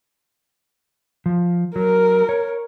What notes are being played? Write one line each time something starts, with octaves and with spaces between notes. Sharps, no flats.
F3
F#3 A#4
C#5